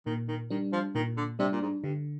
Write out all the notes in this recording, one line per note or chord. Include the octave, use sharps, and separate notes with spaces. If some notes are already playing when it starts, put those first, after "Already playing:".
A#2 D#3
D#3
D#3 G3 D4
F3
A#2 D#3
D3
C3 G3 D4
A#2
G#2
G2 D3